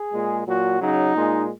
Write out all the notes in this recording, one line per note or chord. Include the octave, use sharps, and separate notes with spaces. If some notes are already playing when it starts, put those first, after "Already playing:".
Already playing: G#4
A#2 G#3
A#2 F#3 F#4
C#3 F#3 D#4
A#2 G#3